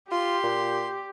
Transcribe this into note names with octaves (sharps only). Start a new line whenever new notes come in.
F4 G4 C6
A#2